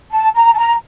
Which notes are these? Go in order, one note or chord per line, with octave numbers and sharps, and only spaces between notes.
A5
A#5
A5
A#5